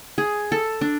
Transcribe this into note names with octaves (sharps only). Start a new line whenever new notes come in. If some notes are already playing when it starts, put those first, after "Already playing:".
G#4
A4
D4